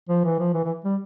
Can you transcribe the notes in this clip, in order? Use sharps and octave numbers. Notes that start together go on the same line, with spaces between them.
F3
E3
F3
E3
E3
G3